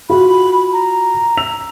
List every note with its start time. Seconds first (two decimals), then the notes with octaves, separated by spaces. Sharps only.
0.10 F4 F#4 B5
0.73 A#5
1.37 E6 F7